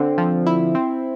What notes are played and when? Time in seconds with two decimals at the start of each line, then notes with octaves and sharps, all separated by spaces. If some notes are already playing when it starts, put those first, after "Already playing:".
Already playing: D3 C4
0.18 F3
0.46 E4
0.75 C4